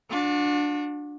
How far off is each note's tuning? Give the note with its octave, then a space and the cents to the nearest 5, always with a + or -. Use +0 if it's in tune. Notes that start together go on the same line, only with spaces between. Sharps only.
D4 +0 F#4 -40